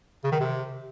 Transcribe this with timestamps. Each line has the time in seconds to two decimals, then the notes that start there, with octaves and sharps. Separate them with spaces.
0.24 C#3
0.32 D#3
0.40 C3